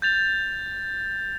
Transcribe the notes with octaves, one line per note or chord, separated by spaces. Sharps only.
G6 A6 F7